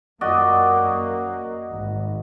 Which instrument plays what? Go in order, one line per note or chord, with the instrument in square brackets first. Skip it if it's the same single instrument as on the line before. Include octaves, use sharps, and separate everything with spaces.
[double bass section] F#2 A#3 [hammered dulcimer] F#4 D5 D#5
[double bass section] G#1